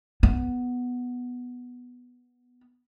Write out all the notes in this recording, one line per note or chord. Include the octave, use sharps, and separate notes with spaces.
B3